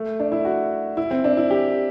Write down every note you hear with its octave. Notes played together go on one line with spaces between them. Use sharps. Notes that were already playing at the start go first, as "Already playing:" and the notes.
Already playing: A3
D4
E4
F#4
E4
C4
D4
E4
G4